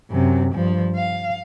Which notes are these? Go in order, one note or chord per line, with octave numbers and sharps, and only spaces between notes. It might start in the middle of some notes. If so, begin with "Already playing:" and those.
F#2 C3
G2 F3
F5